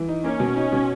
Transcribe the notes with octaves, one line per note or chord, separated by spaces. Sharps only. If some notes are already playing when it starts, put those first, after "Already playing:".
Already playing: E3
D#4
A#3 C#4
B2
D#4
B2